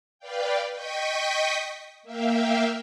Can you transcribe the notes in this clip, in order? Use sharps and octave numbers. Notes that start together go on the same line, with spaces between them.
B4 D5 F5 G5
D#5 G5 C#6 D#6 B6
A#3 E5 F5 G5